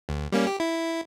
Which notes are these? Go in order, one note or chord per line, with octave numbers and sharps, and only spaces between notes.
D2
G3 A#3 C#4
G4
E4